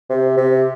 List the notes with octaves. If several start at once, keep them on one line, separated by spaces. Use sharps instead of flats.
C3
C3